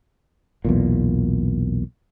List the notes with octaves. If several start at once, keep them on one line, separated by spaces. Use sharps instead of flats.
B1 E2 A#2